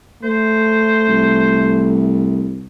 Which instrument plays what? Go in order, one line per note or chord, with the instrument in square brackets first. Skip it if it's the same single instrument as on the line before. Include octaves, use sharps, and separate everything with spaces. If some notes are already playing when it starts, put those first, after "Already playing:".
[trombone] A3 [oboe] C5
[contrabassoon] C2